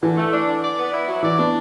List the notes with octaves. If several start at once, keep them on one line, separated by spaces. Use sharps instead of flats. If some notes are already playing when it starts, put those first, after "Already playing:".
D3 E3
A3
D4
D3
D5
B3
E4
F#3
E3 D5
B3 D4